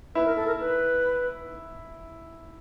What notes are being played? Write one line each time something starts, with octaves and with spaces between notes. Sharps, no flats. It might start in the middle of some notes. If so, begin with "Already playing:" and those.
E4 B4 E5
A#4
A4
A#4
B4